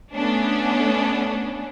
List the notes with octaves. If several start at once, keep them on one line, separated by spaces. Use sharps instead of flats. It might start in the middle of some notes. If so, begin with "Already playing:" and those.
A3 B3 C#4 D4